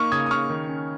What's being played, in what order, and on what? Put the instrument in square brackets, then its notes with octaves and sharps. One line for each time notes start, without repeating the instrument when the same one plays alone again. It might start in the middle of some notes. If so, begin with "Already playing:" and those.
Already playing: [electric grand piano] A#3 D#4 C#6 F6
C#3 D#6 G#6
D#6
C#3 C#6 F6
D#3
C#4